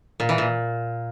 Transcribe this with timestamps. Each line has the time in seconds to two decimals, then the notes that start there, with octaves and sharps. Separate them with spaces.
0.20 A#2
0.29 E3
0.38 A#2